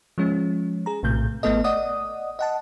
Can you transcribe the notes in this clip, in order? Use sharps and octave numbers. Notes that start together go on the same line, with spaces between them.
F3 G#3 C#4
G#4 A#5
A#1 A2 C3 A3 G6
G#1 A3 B3 A4 D#5
D5 D#5 F#5 D#6
D#5 F#5 A5